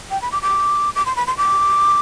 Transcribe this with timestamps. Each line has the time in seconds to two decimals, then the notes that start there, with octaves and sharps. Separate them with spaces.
0.11 G5
0.22 B5
0.32 D6
0.42 D6
0.96 D6
1.06 C6
1.16 B5
1.27 C6
1.37 D6